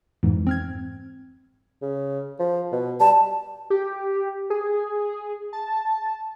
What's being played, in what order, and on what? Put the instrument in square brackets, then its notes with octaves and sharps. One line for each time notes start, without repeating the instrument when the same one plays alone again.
[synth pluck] F2 G#2 E3
C4 F6 G#6
[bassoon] C#3
F3
B2
[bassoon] G3 [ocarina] A5
[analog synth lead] G4
G#4
A5